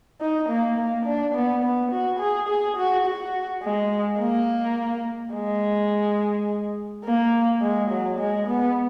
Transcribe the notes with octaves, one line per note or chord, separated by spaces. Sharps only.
D#4
A#3
A#3
D4
B3
B3
F#4
G#4
G#4
F#4
F#4
G#3
A#3
G#3
A#3
G#3
F#3
G#3
B3